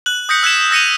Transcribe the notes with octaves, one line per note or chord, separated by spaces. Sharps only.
F#6 F#7
D#6 G6 A#6 B6 C#7
E6 F#6 G#6 B6 E7
E6 A#6 C#7 D#7 F7